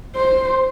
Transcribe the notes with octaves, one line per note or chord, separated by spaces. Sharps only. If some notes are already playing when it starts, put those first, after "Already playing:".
C5